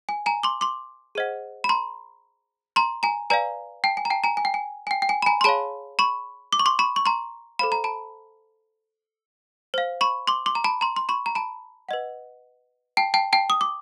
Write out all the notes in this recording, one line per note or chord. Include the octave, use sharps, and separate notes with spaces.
G#5
G#5 A#5
C6 D6
C6 D6
G#4 C5 D#5 F#5
B5
A#5 C6
A#5 C6
G#5 A#5
B4 D5 F5 G#5 A#5
G5 A5
G#5
A#5
G5 A5
G#5 A#5
G#5
G5
G#5
G#5
G5
G5
G#5
B5
G#5 A#5
C6
G#4 C#5 F5 A5 B5
B5 C#6
D6
C#6
C6 D6
B5 C#6
C#6
A#5 C6
A4 C5 F5 B5
A#5
A5 B5
C5 F5
B5 C#6
C6 D6
C6 D6
A#5
A5 B5
A#5 C6
C6
B5 C#6
A#5
A5 B5
B4 D#5 F#5
G5 A5
G5 A5
G5 A5
D#6
D6